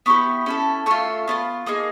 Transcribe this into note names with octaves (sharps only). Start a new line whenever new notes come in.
B3 E4 G4 C#6 D#6
C#4 E4 A4
A3 C#4 F4 E6
B3 D4 F4
A#3 D#4 G#4 D#6